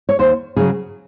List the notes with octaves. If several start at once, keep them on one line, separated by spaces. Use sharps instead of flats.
C#5
D#2 C5
C#3 F#3 G#4